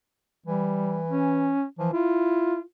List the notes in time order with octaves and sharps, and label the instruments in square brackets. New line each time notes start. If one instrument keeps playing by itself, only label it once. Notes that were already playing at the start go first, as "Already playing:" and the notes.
[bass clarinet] E3 [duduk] G3
[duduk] C#4
[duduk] E3 [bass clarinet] F3
[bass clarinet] E4 [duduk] F4